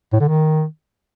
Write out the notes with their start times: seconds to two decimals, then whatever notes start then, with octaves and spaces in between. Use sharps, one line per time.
0.13 A2
0.20 D3
0.28 D#3